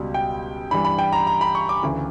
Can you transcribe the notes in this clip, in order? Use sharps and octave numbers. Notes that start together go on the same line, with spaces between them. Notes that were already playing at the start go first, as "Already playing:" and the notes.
Already playing: C#2 B2 G3
G5
G2 E3 G3 B5
B5
G5
A#5
A#5
B5
C#6
D6
D2 C#3 E3